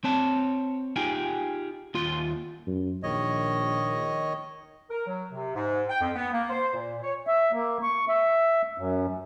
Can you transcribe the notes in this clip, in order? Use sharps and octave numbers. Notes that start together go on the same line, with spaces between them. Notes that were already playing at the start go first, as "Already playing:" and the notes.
C4 C#5 A5
D#4 F4 G4 G#4 G5 G#5
D#2 F4 C6
F#2
A#1 D#3 C#5 D#5
A#4
F#3
C3
G#2
G5
F2
B3
A#3
C5
A#2
C#5
E5
A#3
C#6
E5
F#2